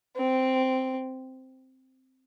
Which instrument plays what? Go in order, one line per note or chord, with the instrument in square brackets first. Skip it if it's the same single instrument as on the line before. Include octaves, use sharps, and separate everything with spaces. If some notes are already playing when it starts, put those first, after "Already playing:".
[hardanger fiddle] C4